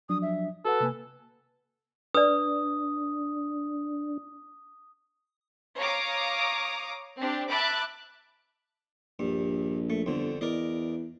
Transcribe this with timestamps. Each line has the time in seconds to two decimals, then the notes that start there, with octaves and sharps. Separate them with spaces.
0.09 F3 F#3 D4 D#6
0.22 E5
0.65 F#4 A4 B4 F#5
0.80 C3 A#3 G#5
2.14 D4 B4 D5 D#6
5.78 C#5 F5 A#5 D6 D#6
7.20 C4 D4 G4
7.50 E5 A5 B5 D6 F#6
9.19 A#1 G2
9.90 A3
10.06 G1 F2 D3
10.41 E2 A#4 D5 D#5